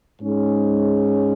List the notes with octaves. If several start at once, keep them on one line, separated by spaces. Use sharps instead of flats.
G#2 G#3 C#4 G#4